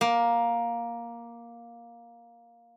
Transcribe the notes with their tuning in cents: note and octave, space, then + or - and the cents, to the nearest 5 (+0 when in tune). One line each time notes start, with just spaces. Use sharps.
A#3 +10